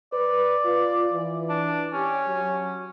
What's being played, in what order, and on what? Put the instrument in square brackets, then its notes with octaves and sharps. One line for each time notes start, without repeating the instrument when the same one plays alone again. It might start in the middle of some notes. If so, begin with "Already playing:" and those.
[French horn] B4 [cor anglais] D5
[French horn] F4
E3
[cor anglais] D4
[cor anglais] C#4 [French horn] G4
[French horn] F#3